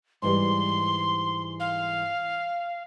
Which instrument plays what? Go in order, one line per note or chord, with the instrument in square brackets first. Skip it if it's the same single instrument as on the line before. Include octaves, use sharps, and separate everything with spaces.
[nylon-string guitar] G#2 E3 G3 [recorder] C6
[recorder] F5